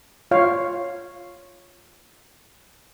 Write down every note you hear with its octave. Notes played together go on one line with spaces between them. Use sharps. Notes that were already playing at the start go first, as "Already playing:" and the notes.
F4 C#5 F5